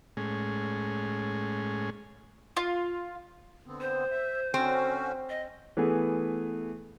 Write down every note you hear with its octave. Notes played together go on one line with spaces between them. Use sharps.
A2 G#3 C#4 G#4
F4
D3 B3 C4
C5
E5
D3 C4 C#4 F#4
D#5
E3 A3 B3 G#4